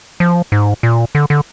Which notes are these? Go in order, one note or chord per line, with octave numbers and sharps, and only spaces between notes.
F3
G#2
A#2
D3
D3